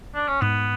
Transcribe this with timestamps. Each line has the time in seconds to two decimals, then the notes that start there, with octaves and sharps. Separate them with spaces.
0.14 D4
0.28 C#4
0.41 G#2 B3